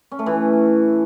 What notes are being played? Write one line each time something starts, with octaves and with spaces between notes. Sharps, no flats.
C#4
A3
E3